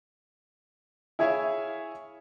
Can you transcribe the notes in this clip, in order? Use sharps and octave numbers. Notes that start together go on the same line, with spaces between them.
E4 G#4 C#5 E5 F5 G#5